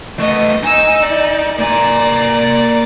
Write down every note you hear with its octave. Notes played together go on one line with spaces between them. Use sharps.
A3 B3 D#5
D#4 G#5 E6
D5
A#3 D5 G#5 A#5